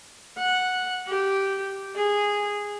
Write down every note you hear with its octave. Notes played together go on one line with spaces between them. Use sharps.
F#5
G4
G#4